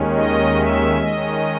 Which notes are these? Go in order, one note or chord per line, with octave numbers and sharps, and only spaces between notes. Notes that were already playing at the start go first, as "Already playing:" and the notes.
Already playing: D#2 D#3 G#3 C#4
D#5
E5
D#3 G#3 C#4 D#5